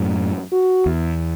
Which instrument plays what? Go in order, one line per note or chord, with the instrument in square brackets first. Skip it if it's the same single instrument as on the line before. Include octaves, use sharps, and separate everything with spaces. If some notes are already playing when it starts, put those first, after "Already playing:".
Already playing: [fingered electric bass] F#2 A2
[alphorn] F#4
[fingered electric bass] E2